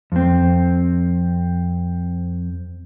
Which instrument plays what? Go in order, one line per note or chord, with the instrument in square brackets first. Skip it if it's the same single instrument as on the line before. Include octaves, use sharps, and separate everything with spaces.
[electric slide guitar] F2 C4